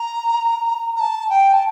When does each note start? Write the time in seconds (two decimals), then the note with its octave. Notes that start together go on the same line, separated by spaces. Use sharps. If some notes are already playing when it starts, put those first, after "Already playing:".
Already playing: A#5
0.96 A#5
1.00 A5
1.30 G5
1.53 A5